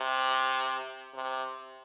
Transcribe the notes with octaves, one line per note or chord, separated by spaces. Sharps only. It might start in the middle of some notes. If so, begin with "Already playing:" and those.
Already playing: C3
C3